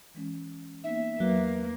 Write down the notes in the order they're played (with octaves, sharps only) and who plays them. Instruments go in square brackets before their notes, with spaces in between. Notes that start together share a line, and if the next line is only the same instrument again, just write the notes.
[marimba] E3 G#3 C#4
[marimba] A#3 B3 D#4 [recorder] E5
[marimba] E2 B4 [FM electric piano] F#3 [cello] A#3